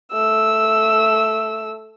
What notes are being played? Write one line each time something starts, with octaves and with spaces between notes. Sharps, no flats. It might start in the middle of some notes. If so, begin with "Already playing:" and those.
A3 E6